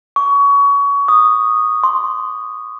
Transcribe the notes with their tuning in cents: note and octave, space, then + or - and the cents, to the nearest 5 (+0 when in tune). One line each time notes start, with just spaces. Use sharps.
C#6 +25
D#6 -10
C6 +0